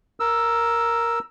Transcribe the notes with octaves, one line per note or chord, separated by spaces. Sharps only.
A#4 E6